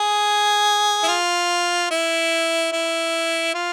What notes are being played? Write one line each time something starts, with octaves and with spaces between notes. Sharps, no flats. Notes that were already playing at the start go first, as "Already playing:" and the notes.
Already playing: G#4
E4
F4
E4
E4
F4